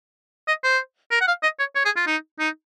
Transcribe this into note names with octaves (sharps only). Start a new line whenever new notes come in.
D#5
C5
A#4
F#5
F5
D#5
C#5
C#5
G#4
F4
D#4
D#4